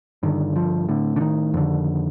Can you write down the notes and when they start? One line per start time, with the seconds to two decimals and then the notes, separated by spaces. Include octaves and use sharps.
0.23 G2 D3 D#3
0.56 F3
0.89 A2 D3
1.16 D3
1.21 D#3
1.54 F2 D3